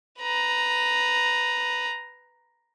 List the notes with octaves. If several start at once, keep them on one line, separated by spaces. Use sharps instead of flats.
B4 A#5